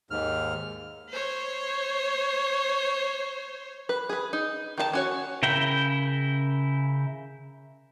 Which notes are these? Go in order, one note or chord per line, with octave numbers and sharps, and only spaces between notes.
D#2 G#2 F6
C5 C#5
B4
G#4 B4
D#4
D#3 F4 A5
C#4 F#4 C#5
C#3 E4 A#4 G5